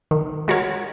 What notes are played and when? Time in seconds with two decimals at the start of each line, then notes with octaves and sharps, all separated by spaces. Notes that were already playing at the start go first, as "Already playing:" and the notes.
0.11 D#3
0.48 G#3 F#4 A#4 C#5